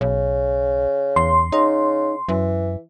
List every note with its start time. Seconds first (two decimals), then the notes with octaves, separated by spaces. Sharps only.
0.01 B1 C#3
1.16 E2 C6
1.52 C#3 D#4
2.28 F#2 E3